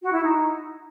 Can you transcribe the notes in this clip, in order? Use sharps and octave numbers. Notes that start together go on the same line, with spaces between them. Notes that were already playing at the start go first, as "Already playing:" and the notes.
F#4
E4
D#4